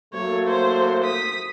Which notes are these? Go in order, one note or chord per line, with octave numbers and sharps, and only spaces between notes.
F#3 A3 A#3 C#5
C5
D#6 B6